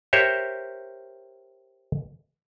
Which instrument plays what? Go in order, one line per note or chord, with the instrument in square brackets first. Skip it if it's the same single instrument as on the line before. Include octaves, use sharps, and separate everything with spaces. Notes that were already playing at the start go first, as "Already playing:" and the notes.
[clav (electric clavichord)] G4 A#4 C5 C#5 E5